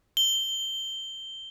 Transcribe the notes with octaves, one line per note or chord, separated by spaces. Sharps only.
G7